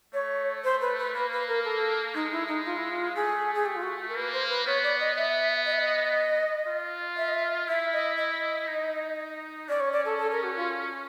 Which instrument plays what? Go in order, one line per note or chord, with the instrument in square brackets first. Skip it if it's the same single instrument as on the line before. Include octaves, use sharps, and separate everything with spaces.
[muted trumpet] A3 [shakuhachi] C#5
[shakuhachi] C5
B4
B4
[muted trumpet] A#3 [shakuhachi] B4
[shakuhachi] B4
A#4
A4
[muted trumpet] G#3 [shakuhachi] D#4
[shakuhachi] E4
D#4
F4
E4
F4
[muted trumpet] A3 [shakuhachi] G#4
[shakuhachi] G#4
G4
F4
F#4
A#4
[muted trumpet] A#3 [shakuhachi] B4
[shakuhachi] C5
B4
[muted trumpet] B3 [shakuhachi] C#5
[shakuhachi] D5
D#5
[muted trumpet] B3 [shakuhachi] E5
[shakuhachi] D#5
E5
D#5
[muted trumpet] F4
[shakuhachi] E5
D#5
E5
[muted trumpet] E4 [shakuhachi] E5
[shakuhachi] D#5
D#5
[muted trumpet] D#4
[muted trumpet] C#4 [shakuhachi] D5
[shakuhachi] C#5
D5
A4
A4
A#4
F#4
F4